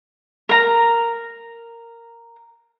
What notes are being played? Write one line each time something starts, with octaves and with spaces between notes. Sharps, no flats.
A#4 A#5